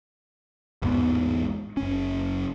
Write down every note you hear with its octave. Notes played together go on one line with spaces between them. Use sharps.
A1 E2 G#2 B3
F#1 C#4